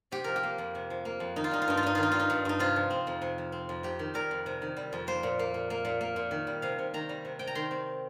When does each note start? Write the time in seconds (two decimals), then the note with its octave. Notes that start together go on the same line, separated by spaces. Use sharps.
0.12 C3 G4
0.24 F3 A#4
0.36 G4
0.43 A#3
0.58 F2
0.75 C3
0.90 F3
1.05 A#3
1.20 F2
1.36 D#3 D#4
1.44 F4
1.51 G3 D#4
1.62 F4
1.68 G2 D#4
1.77 F4
1.83 G2 D#4
1.95 D#3 F4
2.03 D#4
2.12 G3 F4
2.20 D#4
2.30 G2
2.45 G2 D#4
2.59 C3 F4
2.76 F3
2.90 C4
3.07 F2
3.22 C3
3.38 F3
3.52 C4
3.69 F2
3.83 C3 G4
3.99 D#3
4.14 G3 A#4
4.31 F2
4.46 C3
4.62 D#3
4.77 G3
4.93 F2
5.07 A#3 C5
5.23 A#2
5.39 A#3
5.54 A#2
5.70 A#3
5.85 A#2
6.01 A#3
6.16 A#2
6.31 D#3
6.47 G3
6.62 C3 F5
6.79 C3
6.94 D#3 A#5
7.09 G3
7.25 C3
7.39 C3 G5
7.47 A#5
7.55 D#3 C6
7.71 C4